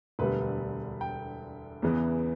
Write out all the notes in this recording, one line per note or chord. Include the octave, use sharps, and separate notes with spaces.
E1 D2 D3 G3 B4
G5
E2 C#3 E3 B3